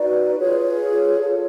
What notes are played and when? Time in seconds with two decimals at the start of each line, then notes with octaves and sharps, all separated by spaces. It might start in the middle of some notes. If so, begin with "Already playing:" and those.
Already playing: D#4 F#4 B4 D5
0.39 F4 G#4 B4 C#5
0.60 C#5
1.20 F4 A4 C#5